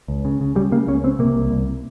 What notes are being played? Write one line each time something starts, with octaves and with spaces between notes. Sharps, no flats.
C#2
C#3
C#3
C#3 G3
C#3 A#3
C#2 C#4
C#3 C4
C3 A#3
C2
C2